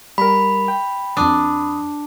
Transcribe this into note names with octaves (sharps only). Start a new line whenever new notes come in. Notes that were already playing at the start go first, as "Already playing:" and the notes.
G3 A#4 B5
G5
F2 D4 D#6